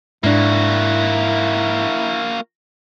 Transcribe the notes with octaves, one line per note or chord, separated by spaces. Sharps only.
G#2 A#3 D4 E4 F#4